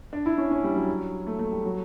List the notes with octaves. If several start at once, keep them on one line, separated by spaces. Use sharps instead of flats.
D4
E4
C#4
C#4
G3
F#3
A3
A3
G3
F#3